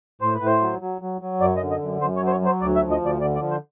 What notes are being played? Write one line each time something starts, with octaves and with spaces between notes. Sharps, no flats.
A2 C5
B4
A2
C5
F#3
F#3
F#3
F#3
F#2 D5
D#5
D3
D#5
F#2
F#2 C5
C#5
F#3
C5
C#5
F#3 C5
D2 D5
E5
F3
D#5
D2 D5
D3 D5
D5
F3
C5